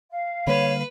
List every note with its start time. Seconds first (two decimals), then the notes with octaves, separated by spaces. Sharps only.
0.11 F5
0.47 D3 G3 A#3 B4 C#5